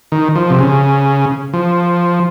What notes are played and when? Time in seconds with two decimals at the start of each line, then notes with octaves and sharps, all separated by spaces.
0.12 D#3
0.35 F3
0.50 C3
0.59 C#3
1.53 F3